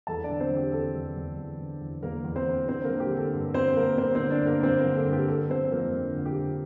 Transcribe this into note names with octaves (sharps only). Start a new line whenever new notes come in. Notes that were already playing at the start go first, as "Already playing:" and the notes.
E2 A4 A5
D4 D5
D3
C4 C5
E2
G4
E2 A4
E2
E2
E2
D3
E2
E2 A#3 A#4
E2
C4 C5
E2
D3 C4 C5
A#3 A#4
D3
G4
D3
A4
G2
D3 C4 C5
G2 A#3 A#4
D3 C4 C5
D3 C4 C5
D4 D5
G2 A#3 A#4
G2 C4 C5
A#3 A#4
D3
A4
G2
G4
D3 A4
D3 C4 C5
F2 A#3 A#4
D3
D3
G4
D3